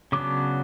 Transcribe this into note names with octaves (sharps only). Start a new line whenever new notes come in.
C#3 F#3 B3 D4 D6